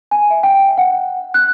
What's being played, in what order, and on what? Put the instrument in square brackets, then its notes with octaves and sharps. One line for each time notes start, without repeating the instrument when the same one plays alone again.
[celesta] G#5
E5
G5
F#5
F#6